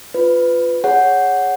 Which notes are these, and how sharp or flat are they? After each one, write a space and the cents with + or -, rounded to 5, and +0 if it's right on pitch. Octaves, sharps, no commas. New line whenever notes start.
F4 +0 B4 +20
G#4 +0 C#5 +0 F#5 +0